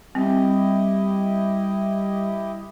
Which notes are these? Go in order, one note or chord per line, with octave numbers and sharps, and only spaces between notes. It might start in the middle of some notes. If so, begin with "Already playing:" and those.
G3 C4 E4 G4 D#5